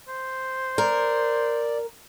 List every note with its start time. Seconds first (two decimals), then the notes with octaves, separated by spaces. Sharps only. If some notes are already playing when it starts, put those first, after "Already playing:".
0.08 C5
0.78 A#4 D5